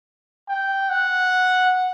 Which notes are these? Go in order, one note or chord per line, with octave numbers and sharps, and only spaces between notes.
G5
F#5